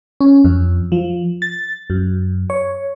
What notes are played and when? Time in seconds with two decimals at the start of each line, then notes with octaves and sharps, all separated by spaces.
0.20 C#4
0.44 F2
0.92 F3
1.42 A6
1.90 F#2
2.50 C#5